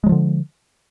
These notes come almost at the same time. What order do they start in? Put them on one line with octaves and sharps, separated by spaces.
G#3 F#3 F3 D3